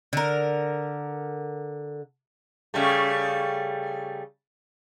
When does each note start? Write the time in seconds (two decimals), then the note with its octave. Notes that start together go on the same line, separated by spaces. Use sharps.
0.13 D3 A#4
2.74 C#3 G3 A3